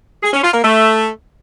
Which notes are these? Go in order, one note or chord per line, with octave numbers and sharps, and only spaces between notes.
G#4
C#4
F4
A#3
A3